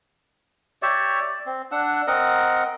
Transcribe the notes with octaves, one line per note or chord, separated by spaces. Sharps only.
G4 C#5 D5 E5
D5
C4
D4 F#5 E6
C4 A#4 D#5 F#5